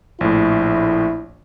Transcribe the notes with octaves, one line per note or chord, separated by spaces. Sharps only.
A#1 A2 E4